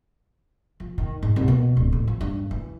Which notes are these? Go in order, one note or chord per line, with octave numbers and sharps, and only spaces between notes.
F3
D#3
G#2
C2
B2
D1
A1
F3
G2
E3